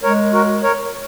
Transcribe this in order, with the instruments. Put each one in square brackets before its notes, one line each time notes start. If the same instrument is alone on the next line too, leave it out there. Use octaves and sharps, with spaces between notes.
[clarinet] G#3 [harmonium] A#4 C#5
[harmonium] F#4 A#4
A#4 C#5